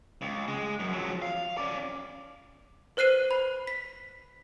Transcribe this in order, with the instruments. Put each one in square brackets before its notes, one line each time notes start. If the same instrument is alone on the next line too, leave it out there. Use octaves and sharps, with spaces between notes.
[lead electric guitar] C#2
G#3
F#2
F3 F#3
F5
C#4 D5
[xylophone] B4 C5 F#6 C7 D#7
B5
B6